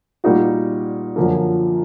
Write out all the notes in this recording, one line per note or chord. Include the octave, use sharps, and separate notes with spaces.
A#2 G3 A#3 D#4 F#4
F#2 D3 F3 A#3